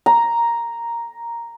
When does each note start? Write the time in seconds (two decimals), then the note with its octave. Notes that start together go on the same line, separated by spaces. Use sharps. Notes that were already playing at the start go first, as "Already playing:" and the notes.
0.06 A#5